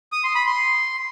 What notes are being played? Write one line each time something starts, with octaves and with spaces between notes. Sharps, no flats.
D#6
C6
B5
C6